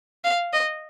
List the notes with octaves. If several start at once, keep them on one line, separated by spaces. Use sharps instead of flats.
F5
D#5